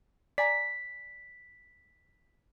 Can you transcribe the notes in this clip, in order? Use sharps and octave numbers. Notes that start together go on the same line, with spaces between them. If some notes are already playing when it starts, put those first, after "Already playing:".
D5 G#5 A#5 B6